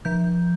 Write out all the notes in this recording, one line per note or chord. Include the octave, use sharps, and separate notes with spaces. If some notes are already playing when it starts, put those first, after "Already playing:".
F3 G6